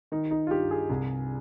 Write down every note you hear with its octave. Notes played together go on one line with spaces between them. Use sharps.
D#3 D#4
D#4
F4
G2 G4
G#4
C2